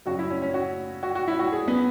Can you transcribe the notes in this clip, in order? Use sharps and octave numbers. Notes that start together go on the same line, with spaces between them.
F#2 C#3 F#3 F#4
E4
C#4
C#4
F#4
F#4
F#4
E4
F#4
G#4
B3